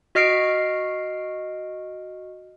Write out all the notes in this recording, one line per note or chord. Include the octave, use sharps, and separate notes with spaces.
F#4 D#5 F6 C7 D7